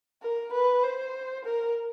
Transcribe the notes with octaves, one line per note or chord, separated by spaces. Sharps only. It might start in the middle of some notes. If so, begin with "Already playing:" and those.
A#4
B4
C5
A#4